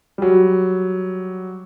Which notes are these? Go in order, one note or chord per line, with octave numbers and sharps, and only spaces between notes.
F#3 G3